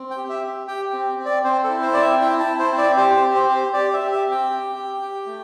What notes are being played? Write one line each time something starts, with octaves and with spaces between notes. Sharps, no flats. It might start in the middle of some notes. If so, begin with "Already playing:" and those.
Already playing: C4
G5
G4
E5
G4
G4 G5
C4
C4
D5
C4 C5
A4
E4
C5
C4 D5
E5
E4 G5
A5
E4
C5
C4
D5
G4 C5
C5
C4
C5
G4
C5
G4 D5
E5
G4
E5
C4
G5
G4
G4
G4
A3